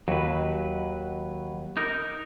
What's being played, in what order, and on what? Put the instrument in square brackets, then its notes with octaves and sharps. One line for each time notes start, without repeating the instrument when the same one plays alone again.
[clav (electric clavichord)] D#2 [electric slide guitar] F#3 B4
[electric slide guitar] D#4 A#4